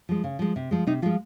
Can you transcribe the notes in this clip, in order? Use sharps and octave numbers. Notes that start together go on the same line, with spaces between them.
F3 G#3
C#3
F3 G#3
C3
F3 G#3
C3 D#4
F3 G#3 F4